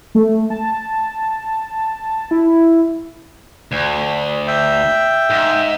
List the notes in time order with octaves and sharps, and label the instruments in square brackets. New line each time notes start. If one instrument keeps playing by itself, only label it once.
[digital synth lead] A3
A5
E4
[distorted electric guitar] D2
[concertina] E5 G5
[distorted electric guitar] G#2